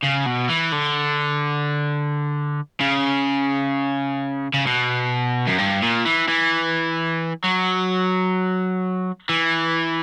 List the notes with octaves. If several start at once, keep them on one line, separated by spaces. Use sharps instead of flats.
C#3
B2
E3
D3
C#3
C#3
B2
F#2
G2
A#2
E3
E3
F#3
E3